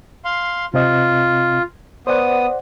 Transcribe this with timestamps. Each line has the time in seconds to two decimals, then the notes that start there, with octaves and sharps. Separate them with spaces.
0.25 F5 C6
0.74 C3 C4 F4 D#5
2.07 B3 C5 D5 F#5 D#6